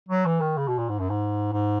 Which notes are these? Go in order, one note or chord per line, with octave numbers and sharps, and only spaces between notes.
F#3
E3
D#3
C#3
B2
A#2
G#2
F#2
G#2
G#2